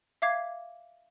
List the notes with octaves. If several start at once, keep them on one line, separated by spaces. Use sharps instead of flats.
E5 F5 D6 G#6 C7